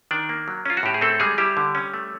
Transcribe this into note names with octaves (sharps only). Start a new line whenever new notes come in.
D#3 D4 D5
A#3
F#3
C#4 F4
F#4
A2 G4
G#4
A3 C4 A4
G3 G#3 G#4
G3 E4 G4
D3
C#4
A3